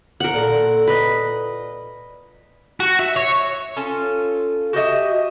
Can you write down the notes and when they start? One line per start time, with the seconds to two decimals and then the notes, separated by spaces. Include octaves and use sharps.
0.20 A#4 F#5
0.34 A#2 A4
0.87 B4 D#5
2.80 F#4
2.99 E5
3.16 C#5
3.76 C#4 F4 A4
4.73 F#4 G4 D#5 E5